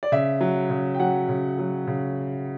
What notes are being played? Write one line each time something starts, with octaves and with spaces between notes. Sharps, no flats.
D5
C#3 E5
F#3
C#3
G5
F#3 F#5
C#3
F#3
C#3